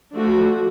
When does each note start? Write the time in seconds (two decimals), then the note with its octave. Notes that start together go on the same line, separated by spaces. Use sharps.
0.15 F3 A3 D4 F#4